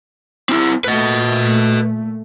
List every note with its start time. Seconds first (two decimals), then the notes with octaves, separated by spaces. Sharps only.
0.49 C4 E4
0.84 A#2 A3 B4 D#5